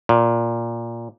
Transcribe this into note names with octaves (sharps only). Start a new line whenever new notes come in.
A#2